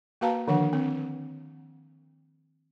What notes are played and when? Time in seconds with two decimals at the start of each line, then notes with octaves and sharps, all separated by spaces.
0.21 A#3 F#4 B4 F5 A5 A#5
0.48 D3 D#3 F3 D4 F#5
0.73 C4